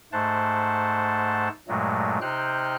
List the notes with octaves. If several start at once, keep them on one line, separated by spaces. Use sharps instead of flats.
G#2 A3 C5 F#5 A5
G2 A#2 F#3 G#3 A3
C3 D#4 C5 G5 F6 F#6